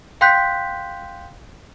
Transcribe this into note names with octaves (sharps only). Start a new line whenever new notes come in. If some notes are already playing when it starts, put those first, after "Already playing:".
F5 G5 C6 F#6 G6 B6